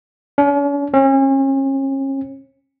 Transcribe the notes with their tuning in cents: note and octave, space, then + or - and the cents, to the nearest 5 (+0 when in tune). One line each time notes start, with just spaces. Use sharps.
C#4 +45
C#4 -35